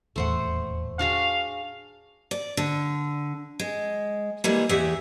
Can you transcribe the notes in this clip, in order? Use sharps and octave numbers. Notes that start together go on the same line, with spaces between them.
D#1 E2 A2 A3 C5 F#5
D4 F#4 G#4 F5
D5
D3
G#3
E3 G3 G#3 A#3
E2 G4 G#4 E5 F#5